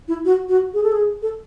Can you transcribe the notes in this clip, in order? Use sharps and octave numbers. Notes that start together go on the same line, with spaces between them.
E4
F#4
F#4
G#4
A4
G#4
A4